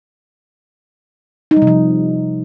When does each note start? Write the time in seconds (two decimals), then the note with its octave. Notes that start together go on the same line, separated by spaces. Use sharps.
1.51 D#4
1.56 G3
1.62 C3
1.67 F3